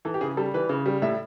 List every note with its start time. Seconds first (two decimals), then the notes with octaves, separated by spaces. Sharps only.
0.05 E3 A4
0.14 G4
0.21 C#3 G#4
0.37 G3 A4
0.54 E3 B4
0.69 C#3
0.86 G3
1.02 A2 E5